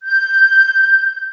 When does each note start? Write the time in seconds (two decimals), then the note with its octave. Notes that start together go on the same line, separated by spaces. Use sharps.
0.03 G6